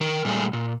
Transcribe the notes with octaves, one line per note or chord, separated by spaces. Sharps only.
D#3 A#4
A#2 G3 A3 G#4
A#2